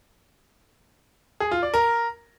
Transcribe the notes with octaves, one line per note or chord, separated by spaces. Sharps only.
G#4
F4
D5
A#4